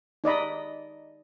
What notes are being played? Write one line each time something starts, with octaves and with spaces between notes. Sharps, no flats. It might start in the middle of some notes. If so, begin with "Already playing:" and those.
D#4 D5 D#5 B5